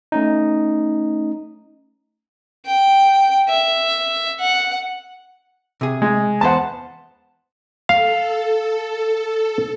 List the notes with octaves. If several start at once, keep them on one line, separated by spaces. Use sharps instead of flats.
A3 C#4 D#4
G5
E5
F#5
C3 G#4
G#3
E2 B3 C5 F#5 A5
A4 F5